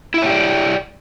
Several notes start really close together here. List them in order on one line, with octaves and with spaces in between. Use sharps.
E4 E5 C#5 G4 D5